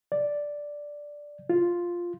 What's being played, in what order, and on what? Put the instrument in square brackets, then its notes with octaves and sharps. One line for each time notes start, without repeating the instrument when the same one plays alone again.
[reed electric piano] D5
F4